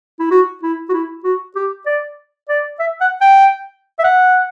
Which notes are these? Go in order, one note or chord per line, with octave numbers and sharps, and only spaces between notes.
E4
F#4
E4
F#4
E4
F#4
G4
D5
D5
E5
F#5
G5
E5
F#5